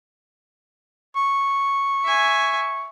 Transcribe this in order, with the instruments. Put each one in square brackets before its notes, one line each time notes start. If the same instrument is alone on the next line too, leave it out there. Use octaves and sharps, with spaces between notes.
[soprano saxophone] C#6
[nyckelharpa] E5 G#5